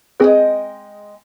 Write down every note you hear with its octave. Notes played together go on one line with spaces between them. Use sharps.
G#3 C4 G#4 B4 D#5 G5